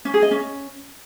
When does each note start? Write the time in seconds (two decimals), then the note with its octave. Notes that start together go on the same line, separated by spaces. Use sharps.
0.05 C#4
0.14 G#4
0.22 D#5
0.31 C#4